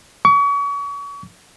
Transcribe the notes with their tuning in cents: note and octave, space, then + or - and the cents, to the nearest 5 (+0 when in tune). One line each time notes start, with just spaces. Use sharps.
C#6 +35